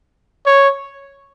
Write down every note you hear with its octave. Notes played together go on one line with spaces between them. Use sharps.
C#5